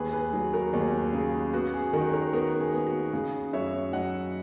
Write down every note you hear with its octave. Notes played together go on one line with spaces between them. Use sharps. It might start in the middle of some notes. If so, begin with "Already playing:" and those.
Already playing: D#2 G#4 B4
G#4 B4
F#3 G#4
F#4 A#4
D#2 G#4
C#3 G#4
B3 F#4
G#4
D#3 F#4 A#4
A#4 C#5
B3 F#4 A#4
G#4
B3
F#4
C#3 G#4
F#2 C#5 E5
F#3 D#5 F#5